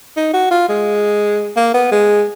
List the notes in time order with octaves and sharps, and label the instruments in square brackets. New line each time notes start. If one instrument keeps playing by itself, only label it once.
[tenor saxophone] D#4
F#4
F4
G#3
A#3
B3
G#3